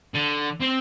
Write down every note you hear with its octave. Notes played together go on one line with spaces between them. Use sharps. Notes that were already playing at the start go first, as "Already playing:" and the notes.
D3
C4